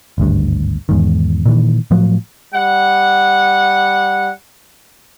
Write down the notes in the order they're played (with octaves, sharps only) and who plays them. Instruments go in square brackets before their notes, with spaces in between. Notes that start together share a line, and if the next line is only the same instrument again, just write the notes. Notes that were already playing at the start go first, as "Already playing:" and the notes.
[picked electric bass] G#1 D2 G2
E2 G#2 D#3
A#2 D#3 E3
A2 F3 F#3
[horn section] G3 F#5